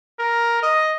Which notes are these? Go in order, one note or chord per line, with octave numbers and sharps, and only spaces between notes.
A#4
D#5